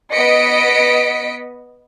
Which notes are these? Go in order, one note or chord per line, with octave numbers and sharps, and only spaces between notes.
B3 D#5 B6 C#7 D7